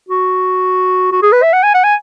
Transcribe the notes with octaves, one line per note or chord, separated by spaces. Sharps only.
F#4
F#4
G#4
B4
E5
F#5
G#5
F#5
G#5